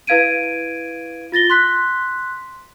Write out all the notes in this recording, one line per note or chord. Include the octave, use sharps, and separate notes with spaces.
E4 B4 F5 G#6 D7 D#7
F4 A6 A#6 G7
C6 F#6 B6